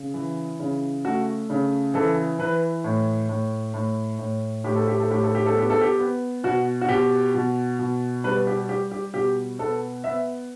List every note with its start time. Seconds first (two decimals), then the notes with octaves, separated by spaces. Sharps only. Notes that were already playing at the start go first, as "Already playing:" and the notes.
Already playing: C#3
0.14 E3
0.60 C#3
1.05 A3 F#4
1.50 C#3
1.94 E3 A4
2.39 E3 B4
2.84 A2
3.29 A2
3.74 A2
4.19 A2
4.64 A2 G4
4.75 A4
4.87 G4
4.99 A4
5.10 A2 G4
5.23 A4
5.35 G4
5.46 A4
5.54 B3 G4
5.70 A4
5.81 G4
5.99 B3
6.44 B2 F#4
6.81 F#4
6.89 B2 G4
7.35 B2
7.79 B2
8.24 G3 B4
8.47 G4
8.69 G3 G4
8.91 G4
9.14 B2 G4
9.59 B3 A4
10.04 B3 E5